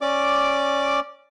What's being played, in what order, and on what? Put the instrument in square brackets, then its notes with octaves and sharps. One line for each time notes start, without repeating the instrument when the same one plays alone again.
[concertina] C#4 D5 D6